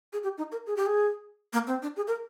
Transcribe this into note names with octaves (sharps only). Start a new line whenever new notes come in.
G#4
G4
D#4
A#4
G#4
G4
G#4
A#3
C4
D4
G#4
A#4